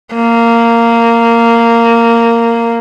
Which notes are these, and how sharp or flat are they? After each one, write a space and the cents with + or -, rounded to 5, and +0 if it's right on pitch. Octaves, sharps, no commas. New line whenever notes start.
A#3 -10